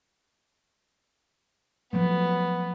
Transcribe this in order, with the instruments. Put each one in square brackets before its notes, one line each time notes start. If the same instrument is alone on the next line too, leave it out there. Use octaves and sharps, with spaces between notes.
[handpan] F3 F#3 A3 [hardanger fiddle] B3